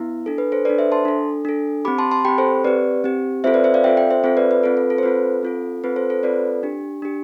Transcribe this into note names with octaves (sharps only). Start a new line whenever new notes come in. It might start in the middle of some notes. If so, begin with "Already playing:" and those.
Already playing: B3 E4
D4 A4
B4
A4 C5
D4 A4 B4 D5
C5 E5
A5 C6
D4 A4
D4 A4
C4 G4 B5 D6
A5 C6
A5 C6
C4 G4 G5 B5
A4 C5
C4 G4 B4 D5
C4 G4
C4 F4 A4 C5 E5
B4 D5
C5 E5
D5 F5
C4 F4 A4 E5 G5
E5 G5
C5 E5
C4 F4 A4 C5 E5
B4 D5
B4
C4 F4 A4 B4
A4
A4
C5
C4 F4 A4 B4
C4 F4 A4
C4 F4 A4 B4
A4 C5
A4 C5
C4 F4 A4 B4 D5
D4 G4
D4 G4